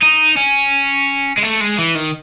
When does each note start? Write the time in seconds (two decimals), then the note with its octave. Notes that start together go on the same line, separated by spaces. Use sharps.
0.02 D#4
0.37 C#4
1.38 G#3
1.43 A3
1.61 G#3
1.79 E3
1.95 D#3